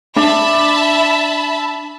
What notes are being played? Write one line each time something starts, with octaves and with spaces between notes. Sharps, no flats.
D4 E5 A5 B5